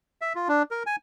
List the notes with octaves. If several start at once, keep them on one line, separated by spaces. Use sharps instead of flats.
E5
F4
D4
A#4
G#5